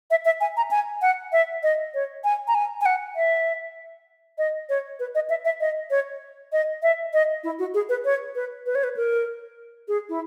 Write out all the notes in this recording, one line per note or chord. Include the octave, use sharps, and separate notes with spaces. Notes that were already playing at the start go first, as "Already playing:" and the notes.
E5
E5
G#5
A#5
G#5
F#5
E5
D#5
C#5
G#5
A#5
G#5
G#5
F#5
E5
D#5
C#5
B4
D#5
E5
E5
D#5
C#5
D#5
E5
D#5
E4
F#4
G#4
B4
C#5
B4
B4
C#5
B4
A#4
G#4
E4